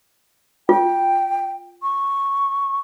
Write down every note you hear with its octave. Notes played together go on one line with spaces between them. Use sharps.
F4 G5
C#6